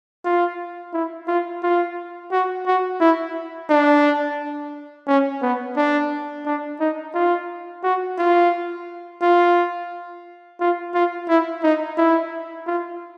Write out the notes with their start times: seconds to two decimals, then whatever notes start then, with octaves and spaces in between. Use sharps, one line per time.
0.25 F4
0.93 E4
1.28 F4
1.63 F4
2.32 F#4
2.66 F#4
3.00 E4
3.69 D4
5.07 C#4
5.42 B3
5.77 D4
6.45 D4
6.80 D#4
7.14 F4
7.83 F#4
8.18 F4
9.22 F4
10.60 F4
10.94 F4
11.28 E4
11.63 D#4
11.97 E4
12.66 F4